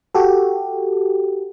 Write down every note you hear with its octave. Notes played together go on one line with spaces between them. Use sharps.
F#4 G4 A4